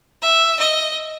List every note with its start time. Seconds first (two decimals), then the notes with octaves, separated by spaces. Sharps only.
0.22 E5
0.59 D#5